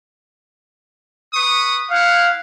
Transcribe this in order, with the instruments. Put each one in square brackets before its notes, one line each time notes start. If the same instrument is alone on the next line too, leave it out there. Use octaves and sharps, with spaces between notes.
[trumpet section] B4 C#6 D#6
[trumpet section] E4 F#5 [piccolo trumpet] F5